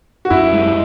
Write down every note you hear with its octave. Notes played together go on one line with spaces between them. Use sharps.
F#4
F#2 E4
G#3